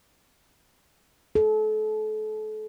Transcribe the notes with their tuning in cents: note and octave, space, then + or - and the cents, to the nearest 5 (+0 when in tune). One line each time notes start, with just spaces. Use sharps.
A4 -35